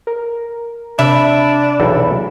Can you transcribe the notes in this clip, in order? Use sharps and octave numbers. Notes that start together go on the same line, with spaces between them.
A#4
C3 D4 E5 B5
B1 E2 A4